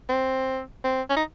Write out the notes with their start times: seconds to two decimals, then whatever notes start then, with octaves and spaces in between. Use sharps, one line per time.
0.09 C4
0.84 C4
1.10 C#4
1.16 D#4